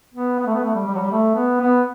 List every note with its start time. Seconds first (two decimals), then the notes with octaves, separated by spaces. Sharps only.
0.14 B3
0.39 B3
0.47 A3
0.55 B3
0.63 A3
0.75 G3
0.87 G3
0.95 F#3
0.99 G3
1.11 A3
1.35 B3
1.60 B3